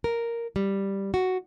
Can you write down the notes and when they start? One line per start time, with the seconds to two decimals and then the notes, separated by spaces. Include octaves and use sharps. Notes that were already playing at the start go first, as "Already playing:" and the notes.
0.04 A#4
0.56 G3
1.14 F#4